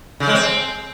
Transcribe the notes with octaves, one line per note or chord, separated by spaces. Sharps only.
C#3
G#3
C4